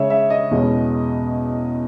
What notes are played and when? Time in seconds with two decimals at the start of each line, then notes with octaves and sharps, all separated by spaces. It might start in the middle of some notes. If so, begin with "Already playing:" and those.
Already playing: C#3 G#3 C#4 C#5 E5
0.10 E5
0.30 D#5
0.51 E2 B2 G#3 C#4